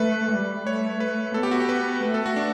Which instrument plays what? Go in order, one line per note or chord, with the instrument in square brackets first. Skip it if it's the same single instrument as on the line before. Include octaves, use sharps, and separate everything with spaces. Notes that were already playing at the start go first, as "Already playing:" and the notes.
Already playing: [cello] A3 [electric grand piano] B4
[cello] G3
[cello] A3 [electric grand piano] C#5
[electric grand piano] B4
[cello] B3 [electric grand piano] A4
[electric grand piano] G4
F#4
G4
B4
[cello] A3 [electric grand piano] B4
[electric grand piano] A4
F#4
D4